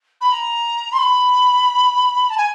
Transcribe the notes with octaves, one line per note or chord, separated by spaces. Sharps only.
B5
A#5
C6
B5
A5
G#5